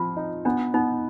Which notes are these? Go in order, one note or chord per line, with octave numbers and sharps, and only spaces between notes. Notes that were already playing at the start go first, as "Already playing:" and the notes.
Already playing: F3 C4 F4
D#4
B3 D4
B3 D#4